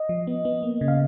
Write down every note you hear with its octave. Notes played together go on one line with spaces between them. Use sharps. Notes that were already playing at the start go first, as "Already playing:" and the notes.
Already playing: D#5
F3
B3
B3
A#3
C#3
F5